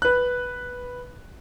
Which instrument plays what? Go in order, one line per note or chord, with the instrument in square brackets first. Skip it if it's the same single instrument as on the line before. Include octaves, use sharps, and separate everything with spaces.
[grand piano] B4 F#6